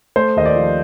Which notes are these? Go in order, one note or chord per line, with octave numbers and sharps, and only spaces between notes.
A3 C5
D#2 D#5
D5
F3